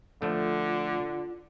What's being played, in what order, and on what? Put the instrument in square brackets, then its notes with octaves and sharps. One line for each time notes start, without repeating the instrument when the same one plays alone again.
[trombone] D3 [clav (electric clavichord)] F3 A3 [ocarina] F4